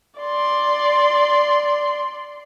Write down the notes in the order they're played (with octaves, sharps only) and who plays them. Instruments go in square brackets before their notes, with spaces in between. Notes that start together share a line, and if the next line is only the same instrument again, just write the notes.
[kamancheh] D5 C6